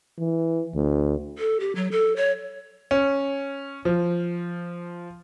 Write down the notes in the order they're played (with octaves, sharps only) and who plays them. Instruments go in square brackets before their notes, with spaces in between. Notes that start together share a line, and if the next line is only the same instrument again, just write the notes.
[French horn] E3
D2
[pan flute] A4
G4
F#3
A4
C#5
[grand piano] C#4
F3